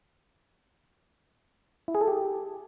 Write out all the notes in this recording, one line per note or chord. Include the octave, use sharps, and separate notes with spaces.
E4
G#4
A4
G4